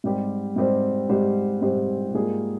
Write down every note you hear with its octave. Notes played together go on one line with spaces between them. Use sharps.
G#2 G3 C4 G4 C5
G#2 G3 C4 G4 C5
G#2 G3 C4 G4 C5
G#2 G3 C4 G4 C5
G#2 G3 A#3 F4 G#4